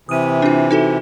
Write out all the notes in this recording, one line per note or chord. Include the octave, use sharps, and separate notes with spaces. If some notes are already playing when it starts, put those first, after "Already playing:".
C3 E3 D#6 D#7
D4 F4
D#4 F#4 A4